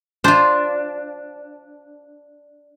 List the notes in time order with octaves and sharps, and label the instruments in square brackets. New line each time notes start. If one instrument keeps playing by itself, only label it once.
[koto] D4 [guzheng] F4 C5